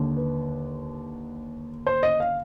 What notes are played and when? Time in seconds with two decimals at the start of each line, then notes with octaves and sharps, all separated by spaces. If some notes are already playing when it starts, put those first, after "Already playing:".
Already playing: D#2 D3
0.17 B4
1.87 C5
2.03 D#5
2.20 F5